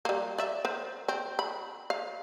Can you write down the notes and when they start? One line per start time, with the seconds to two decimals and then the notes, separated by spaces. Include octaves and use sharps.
0.05 G3 A#3
0.38 D5 E5
0.65 A#4 C5
1.08 C4
1.39 B5
1.90 F5